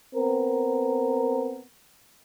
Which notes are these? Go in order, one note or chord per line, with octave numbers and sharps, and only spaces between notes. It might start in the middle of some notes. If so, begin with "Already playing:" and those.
B3 C4 A#4